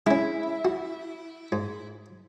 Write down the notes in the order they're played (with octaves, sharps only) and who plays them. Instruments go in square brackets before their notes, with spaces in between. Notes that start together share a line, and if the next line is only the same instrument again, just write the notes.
[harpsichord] G#3 C#4 [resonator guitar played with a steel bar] E4
[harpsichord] F#4
G#2